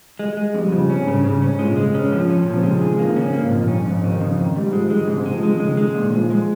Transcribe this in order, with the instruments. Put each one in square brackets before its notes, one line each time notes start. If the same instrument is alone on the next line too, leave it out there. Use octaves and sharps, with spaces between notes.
[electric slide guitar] G#3
G#3
[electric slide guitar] F2 [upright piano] G3
[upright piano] G3
[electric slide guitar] C#3 [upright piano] F3
[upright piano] C3 [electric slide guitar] C#4
[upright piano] G2
[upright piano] G#2 [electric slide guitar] C#3
[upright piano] G2 [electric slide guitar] C#3
[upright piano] G#2 [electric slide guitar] C#4
[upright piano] A#2 [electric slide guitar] G#3
[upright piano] C#3
[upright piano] C3 [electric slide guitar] G#3
[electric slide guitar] C#4
F3
C#4
[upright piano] A#2 [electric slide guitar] F3
[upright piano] C3
[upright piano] C#3 [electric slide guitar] G#3
[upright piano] D#3 [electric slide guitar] G#4
[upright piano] F3 [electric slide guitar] A#3
[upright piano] D#3
[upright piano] C#3 [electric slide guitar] C#4
[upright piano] C3
[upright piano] C#3 [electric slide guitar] A#3
[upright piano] G#2
[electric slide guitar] F2 [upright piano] A#2
[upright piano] G2 [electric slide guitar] C#4
[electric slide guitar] F2 [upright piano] G#2
[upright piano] C3 [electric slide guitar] D#3
[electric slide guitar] F2 [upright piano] C#3
[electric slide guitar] D#3
[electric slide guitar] G#2 [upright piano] G3
[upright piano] F3 [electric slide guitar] G#3
[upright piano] D#3 [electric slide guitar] G#3
[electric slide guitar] G#2 [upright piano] C#3
[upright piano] C3
[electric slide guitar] G#3
[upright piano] F3
[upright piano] D#3 [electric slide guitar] G#3
[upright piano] C#3 [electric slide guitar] G#3
[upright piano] D#3
[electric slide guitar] G#3
A#2
[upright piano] D#3
[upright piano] F3 [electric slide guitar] G#3
[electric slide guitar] G#3